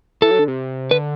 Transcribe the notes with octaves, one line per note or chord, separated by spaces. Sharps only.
E3 A4
F#3
D3
C3
D3 B4